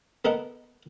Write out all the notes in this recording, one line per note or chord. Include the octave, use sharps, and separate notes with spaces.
B3 A4 A#4 D#5 F#5